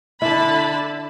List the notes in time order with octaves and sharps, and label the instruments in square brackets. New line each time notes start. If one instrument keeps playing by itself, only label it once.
[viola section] D3 A5 B5 [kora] E4